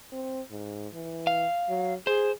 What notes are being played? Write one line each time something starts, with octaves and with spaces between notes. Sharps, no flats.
C4
G#2
E3
F5
F#3
G#4 C5